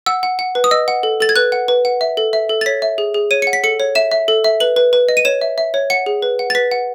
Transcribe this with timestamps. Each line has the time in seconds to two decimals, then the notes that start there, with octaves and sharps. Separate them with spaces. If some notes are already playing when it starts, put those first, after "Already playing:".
0.06 F#5 E6
0.23 F#5
0.39 F#5
0.55 B4
0.64 D#6
0.71 D#5 E6
0.88 F#5
1.03 A4
1.20 A4 A6
1.29 G#6
1.36 B4 F#6
1.52 F#5
1.68 B4
1.85 F#5
2.01 E5
2.17 A4
2.33 E5
2.49 A4
2.61 A6
2.66 C#5 B6
2.82 E5
2.98 G#4
3.14 G#4
3.31 C#5 D#7
3.42 F#5 C#7
3.53 B6
3.64 A4 C#7
3.80 C#5
3.95 E5 E7
4.11 E5
4.28 A4
4.44 E5
4.60 B4 F#7
4.76 B4
4.93 B4
5.09 D#5
5.17 D#7
5.25 C#5 E7
5.41 E5
5.58 E5
5.74 C#5
5.90 F#5 C#7
6.06 G#4
6.22 B4
6.39 F#5
6.50 A6
6.55 B4 B6
6.71 F#5